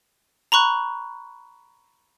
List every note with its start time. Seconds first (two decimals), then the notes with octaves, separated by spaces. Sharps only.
0.52 A#5 B5 C#6 F#6